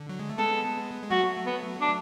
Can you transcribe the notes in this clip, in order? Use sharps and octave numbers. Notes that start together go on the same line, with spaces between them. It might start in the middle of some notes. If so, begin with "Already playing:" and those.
Already playing: D3
F#3
G#3
A3
G#3 B3 A4
G#3
F#3 A3 F#4
B3
D4